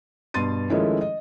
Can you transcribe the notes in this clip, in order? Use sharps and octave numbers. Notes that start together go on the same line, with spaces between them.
G2 B2 C6 A6 D#7
D#3 F3 G#3 A3 C#4 E4
D#5